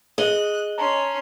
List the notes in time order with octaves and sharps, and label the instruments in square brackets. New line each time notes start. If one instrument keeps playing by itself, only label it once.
[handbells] G#4 [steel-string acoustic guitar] D#5 [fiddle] F#6
[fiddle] C#4 C6 [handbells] A5 A#5